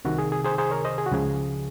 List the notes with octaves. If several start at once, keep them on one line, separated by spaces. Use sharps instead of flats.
C2 C3 D#3 F#4
G#4
G#4
G#4 C5
G#4 C5
A#4 C#5
C5 D#5
G#4
F#4
C#2 C#3 F3 G#4